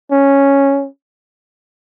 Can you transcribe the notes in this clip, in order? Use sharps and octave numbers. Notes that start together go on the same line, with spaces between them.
C#4